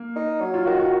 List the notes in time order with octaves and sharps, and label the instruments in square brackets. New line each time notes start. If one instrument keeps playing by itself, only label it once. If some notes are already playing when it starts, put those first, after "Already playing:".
Already playing: [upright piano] A#3
[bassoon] D#4
F#3
[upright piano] F4
[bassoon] D#3 [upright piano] F#4
[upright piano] F#4